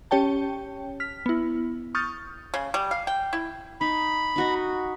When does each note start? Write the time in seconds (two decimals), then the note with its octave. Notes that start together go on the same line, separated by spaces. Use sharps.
0.11 C#4 G4 C#5 G5 A5
1.00 F6 B6
1.26 B3 E4
1.95 C#6 D#6 F6 G6 A6
2.54 C#3
2.74 G3
2.91 F5
3.07 G5
3.33 E4
3.81 D#4 B5
4.36 D#4 F#4 D#5